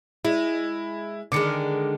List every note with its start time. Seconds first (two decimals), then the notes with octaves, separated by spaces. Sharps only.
0.25 G#3 E4
1.32 D3 D#3 G#3 D6 C#7